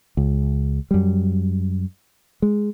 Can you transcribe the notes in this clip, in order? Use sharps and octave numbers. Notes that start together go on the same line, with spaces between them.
C#2
F#2 G3
G#3